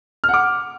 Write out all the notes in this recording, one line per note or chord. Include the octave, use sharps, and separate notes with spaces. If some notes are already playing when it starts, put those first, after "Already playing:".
F#5 D6 F6